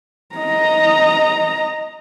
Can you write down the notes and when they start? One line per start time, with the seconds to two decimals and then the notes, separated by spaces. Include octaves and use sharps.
0.35 D#5 A#5